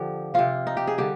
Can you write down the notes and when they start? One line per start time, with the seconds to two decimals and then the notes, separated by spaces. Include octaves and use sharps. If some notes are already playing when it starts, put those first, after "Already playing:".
Already playing: D3 F3 G4
0.34 C3 F3 F4
0.67 D#4
0.77 G4
0.87 G#4
0.98 D3 G3 G4